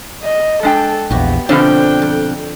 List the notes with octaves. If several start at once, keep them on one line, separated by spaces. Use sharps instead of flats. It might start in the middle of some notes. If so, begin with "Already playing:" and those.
D#5
G#3 D4 A4 G5
A#1 E2 B3 F#4 G4
B2 D3 F3 C4 D4 G5
F2